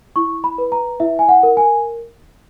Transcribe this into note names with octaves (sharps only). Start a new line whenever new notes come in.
E4 C#6
B5
B4
A#5
E4 E5
G#5
F#5
A#4
G#5